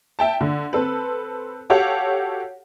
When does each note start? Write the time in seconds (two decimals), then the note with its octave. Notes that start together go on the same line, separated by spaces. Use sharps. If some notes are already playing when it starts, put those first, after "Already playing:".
0.19 E5 G5 A5
0.41 D3
0.73 C4 A4 B4
1.70 F#4 G4 A4 C#5 F5 F#5